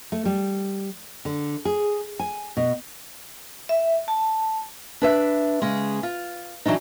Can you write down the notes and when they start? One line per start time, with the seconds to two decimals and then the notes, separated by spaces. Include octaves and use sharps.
0.12 A3
0.25 G3
1.25 D3
1.65 G#4
2.20 G#5
2.57 B2
3.69 E5
4.08 A5
5.02 D4 B4 E5
5.62 C#3 G#3
6.03 F4
6.66 E3 F#3 D4 D#4